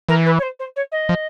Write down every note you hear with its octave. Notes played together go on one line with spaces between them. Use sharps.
E3 A#4
B4
C#5
C5
C5
C#5
D#5
F3